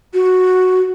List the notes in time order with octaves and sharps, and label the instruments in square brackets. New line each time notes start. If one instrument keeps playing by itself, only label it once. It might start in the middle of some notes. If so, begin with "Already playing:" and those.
[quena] F#4